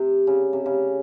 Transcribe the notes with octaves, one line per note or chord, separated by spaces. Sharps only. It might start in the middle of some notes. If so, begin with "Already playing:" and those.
Already playing: C3
C#3
C3
C#3